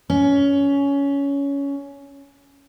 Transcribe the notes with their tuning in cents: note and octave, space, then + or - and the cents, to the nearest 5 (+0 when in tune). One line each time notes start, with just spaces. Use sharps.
C#4 +15